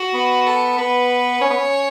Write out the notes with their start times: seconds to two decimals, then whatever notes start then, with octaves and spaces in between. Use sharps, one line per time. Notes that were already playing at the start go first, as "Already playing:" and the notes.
Already playing: F#4
0.14 B3
0.47 A4
0.78 B3 B4
1.41 C#4 C#5
1.50 B3
1.58 C#4